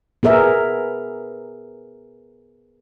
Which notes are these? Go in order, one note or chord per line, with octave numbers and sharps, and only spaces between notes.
B3 G#4 A#4 E5